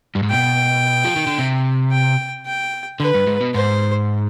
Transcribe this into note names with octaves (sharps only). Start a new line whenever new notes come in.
G2
G#2
B2 G5
F3
D#3
D3
C3
G5
G5
D3 B4
G2
G#2
B2
G#2 C5